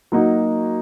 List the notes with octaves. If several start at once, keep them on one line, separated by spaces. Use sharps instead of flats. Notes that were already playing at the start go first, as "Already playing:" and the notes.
F#3 A#3 D#4 F#4